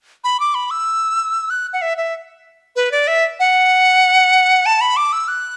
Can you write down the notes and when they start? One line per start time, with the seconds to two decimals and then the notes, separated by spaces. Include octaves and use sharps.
0.24 B5
0.40 D6
0.55 B5
0.71 E6
1.50 F#6
1.73 F#5
1.82 E5
1.98 E5
2.76 B4
2.92 D5
3.08 E5
3.40 F#5
4.66 A5
4.81 B5
4.97 D6
5.13 E6
5.28 F#6